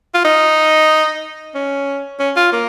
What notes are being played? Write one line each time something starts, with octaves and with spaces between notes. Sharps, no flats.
F4
D#4
C#4
C#4
F4
A#3